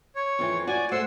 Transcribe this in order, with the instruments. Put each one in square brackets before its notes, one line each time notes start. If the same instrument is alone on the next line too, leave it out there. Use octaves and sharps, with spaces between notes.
[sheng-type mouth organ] C#5
[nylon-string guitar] F2 E3
[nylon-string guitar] F#4 [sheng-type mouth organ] D5 G#5
[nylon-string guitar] A3 C5 [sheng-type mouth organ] F#5 C6 E6